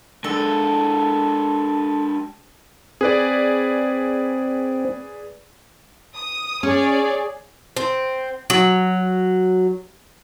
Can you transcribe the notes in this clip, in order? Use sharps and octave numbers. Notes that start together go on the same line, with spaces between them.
G#3 D4 A4
C4 G#4 B4 D5
D#6
C#4 G#4 C#5 D5
C4
F#3